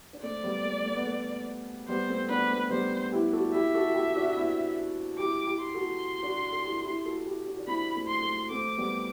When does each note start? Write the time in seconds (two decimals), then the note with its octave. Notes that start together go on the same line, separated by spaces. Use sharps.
0.13 D4
0.22 A3 C4 D5
0.43 G3 B3
0.64 A3
0.85 A3
0.95 B3
1.06 A3
1.88 G3 B3 C5
2.09 A3 C4
2.29 B3 D4 B4
2.50 A3 C4
2.71 G3 B3 C5
3.12 E4 G4
3.33 F#4 A4
3.54 E4 G4 E5
3.74 F#4 A4
3.94 E4 G4
4.16 D4 F#4
4.36 C4 E4
5.19 E4 G4 D6
5.47 E4 G4
5.61 C6
5.74 F#4 A4
6.22 D4 F#4
6.52 A4
6.64 E4 G4
6.76 A4
6.85 E4 G4
7.05 F#4 A4
7.26 E4 G4
7.47 D4 F#4
7.58 D4
7.67 C4 E4 B5
7.95 A3 C4
8.08 C6
8.23 A3
8.50 A3 C4 D6
8.77 G3 B3